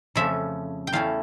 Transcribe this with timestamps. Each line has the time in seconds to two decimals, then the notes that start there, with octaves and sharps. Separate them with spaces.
0.15 F2 C#3 F3 A3 C#4 E5
0.87 G5
0.93 E2 E3 A3 C#4 F5